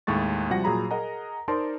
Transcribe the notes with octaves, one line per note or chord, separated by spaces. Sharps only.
D#2 A2 G#3 C#6 A6
C3 F3 G3 F#4 F#5 A#6
A#2 F#3 G#4 A#5 B5
G#4 A#4 D#5 F#5 A#5
D#4 A#4 C5 D5 A5 C6